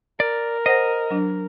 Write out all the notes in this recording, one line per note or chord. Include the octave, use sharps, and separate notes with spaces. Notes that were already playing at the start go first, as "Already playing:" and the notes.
A#4 D5
C5 D#5 F#5 A#6
F#3 D4